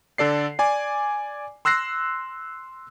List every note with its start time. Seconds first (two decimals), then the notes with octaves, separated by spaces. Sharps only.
0.18 D3 A4 D5 C7
0.59 D5 G#5 D6
1.65 C6 E6 F#6 A#6 C7